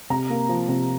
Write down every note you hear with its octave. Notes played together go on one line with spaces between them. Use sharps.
C3 A#5
A#3
F3
C3